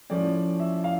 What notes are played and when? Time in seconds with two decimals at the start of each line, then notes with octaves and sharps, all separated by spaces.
0.10 A2 F3 A3 C#4 D5
0.60 E5
0.84 F5